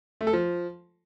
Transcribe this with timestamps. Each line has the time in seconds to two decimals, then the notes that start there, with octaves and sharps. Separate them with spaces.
0.21 A3
0.27 A4
0.33 F3